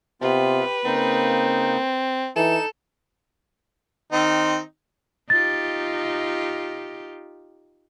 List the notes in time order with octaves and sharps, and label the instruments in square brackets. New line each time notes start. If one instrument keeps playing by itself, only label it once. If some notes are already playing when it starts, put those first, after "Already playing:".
[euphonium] C3 [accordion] B3 F4 [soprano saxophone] G4 [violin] B4
[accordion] C#3 D#4 [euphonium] A#3 [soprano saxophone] C4
[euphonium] E3 [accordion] D#4 [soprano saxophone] A4 [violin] E7
[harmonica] D#3 C4 D#4
[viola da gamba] D#4 F4 G4 [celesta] A6